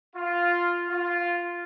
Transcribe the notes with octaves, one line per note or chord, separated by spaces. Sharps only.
F4
F4